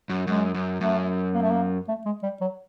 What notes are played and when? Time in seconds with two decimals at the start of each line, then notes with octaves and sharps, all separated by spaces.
0.10 F#2
0.27 F#2 G#3
0.54 F#2
0.81 F#2 A3
1.35 A#3
1.42 A3
1.51 A#3
1.88 A3
2.06 G#3
2.23 G3
2.41 F#3